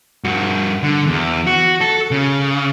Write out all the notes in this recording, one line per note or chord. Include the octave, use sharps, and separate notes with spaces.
G2 F#4
D3
E2
F#4
A4
C#3